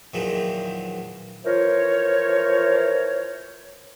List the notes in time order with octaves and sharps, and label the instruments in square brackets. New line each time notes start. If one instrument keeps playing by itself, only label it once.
[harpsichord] E2 A#2 D#3 F3 F#3
[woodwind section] E3 F3 F4 A#4 C5 C#5